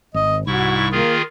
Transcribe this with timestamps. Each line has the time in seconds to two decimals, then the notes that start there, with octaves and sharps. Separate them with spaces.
0.14 G#1 D#5
0.47 C2 G#2 E4 F#4 C#6
0.92 D#3 A#3 F4 G#4